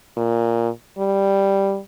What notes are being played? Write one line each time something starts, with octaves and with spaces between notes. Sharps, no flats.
A#2
G3